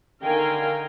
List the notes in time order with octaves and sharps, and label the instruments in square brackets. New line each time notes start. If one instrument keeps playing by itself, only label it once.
[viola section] D3 D#3 F5 G5 G#5 A#5